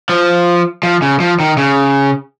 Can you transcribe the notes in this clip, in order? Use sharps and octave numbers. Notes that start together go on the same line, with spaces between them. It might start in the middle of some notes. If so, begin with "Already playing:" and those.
F3
F3
C#3
F3
D#3
C#3